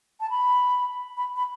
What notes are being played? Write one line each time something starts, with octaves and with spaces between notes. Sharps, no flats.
A5
B5
B5
B5